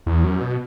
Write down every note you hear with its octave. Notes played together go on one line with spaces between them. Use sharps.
E2
F#2
B2